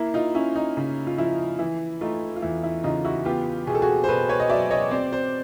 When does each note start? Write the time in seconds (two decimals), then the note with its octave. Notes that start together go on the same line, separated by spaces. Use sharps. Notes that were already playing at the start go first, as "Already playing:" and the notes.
Already playing: A#3 E4
0.14 D#4 F4
0.35 C#4 E4
0.56 D#4
0.77 C#3
1.07 F4
1.18 F3 E4
1.59 E3 E4
2.01 A3 D#4 F4
2.36 F4
2.42 E2 E4
2.63 E4
2.84 C#3 D#4 F4
3.05 E4 F#4
3.25 B3 F4 G4
3.67 B2 G#4
3.75 A4
3.82 F#4 G#4
4.04 C5
4.08 B2 A4 B4
4.29 B4 C#5
4.40 D#5
4.49 F#3 D5 E5
4.71 C#5 D#5
4.91 C4 C5 D5
5.12 C5 D5